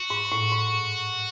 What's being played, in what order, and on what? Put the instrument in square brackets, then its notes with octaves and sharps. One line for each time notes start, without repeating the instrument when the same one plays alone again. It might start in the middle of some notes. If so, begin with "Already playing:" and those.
Already playing: [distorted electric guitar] F#4
[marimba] G#2
A2
G#2